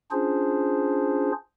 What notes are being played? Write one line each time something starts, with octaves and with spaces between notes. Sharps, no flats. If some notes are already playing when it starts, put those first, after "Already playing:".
C#4 D4 F4 G#4 C5